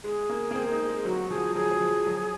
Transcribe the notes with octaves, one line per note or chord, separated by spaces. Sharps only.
G#3 G#4
A#3
A#3
C4
D#4
G#3
F#3 F#4
F3 G#4
F#3 G#4
F#3
F3
F#3